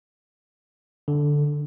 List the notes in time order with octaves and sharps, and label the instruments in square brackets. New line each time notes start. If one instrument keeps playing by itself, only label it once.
[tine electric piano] D3